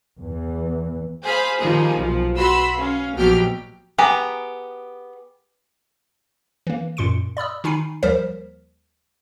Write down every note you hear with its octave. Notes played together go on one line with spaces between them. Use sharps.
E2 E3
G#4 C5 F5 B5
D#3 F3 G3 A#3 D#4 G#4
B1 F3
F#4 B4 B5 C6 E6
C#4 F5
A#1 B2 F#3 G4 G5 F6
B3 G4 G#4 A#5 B5
E3 A#3
F#2 A#2 C6 C#7 D7
D5 B5 D#6 E6
D#3 D#4 G#5 B5 C7
D#2 F3 G3 A#4 C5 B6